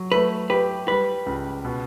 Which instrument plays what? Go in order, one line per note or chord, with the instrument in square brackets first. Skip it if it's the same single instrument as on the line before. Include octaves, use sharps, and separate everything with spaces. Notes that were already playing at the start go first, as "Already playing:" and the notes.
Already playing: [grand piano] F#3
[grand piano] A3 [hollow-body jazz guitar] B4
[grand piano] G4 [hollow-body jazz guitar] B4
[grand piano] G3 [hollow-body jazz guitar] B4
[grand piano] C#2
B2